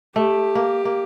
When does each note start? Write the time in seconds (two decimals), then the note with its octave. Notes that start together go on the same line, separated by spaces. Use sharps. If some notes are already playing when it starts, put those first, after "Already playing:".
0.16 A3 G4
0.55 A#3
0.85 A#3